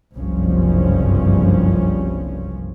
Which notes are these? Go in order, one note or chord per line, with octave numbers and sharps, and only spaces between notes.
F#1 C2 G2 F3 C#4